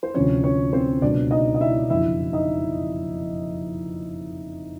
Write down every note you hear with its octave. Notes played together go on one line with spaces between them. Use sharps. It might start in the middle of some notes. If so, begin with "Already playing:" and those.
C5
D2 C3 F3 C#4 C#5
C#4 C#5
C4 C5
C#2 B2 F#3 D4 D5
D#4 D#5
D#5
E4 E5
F#1 F2 D3 F#3 E4 E5
D#4 D#5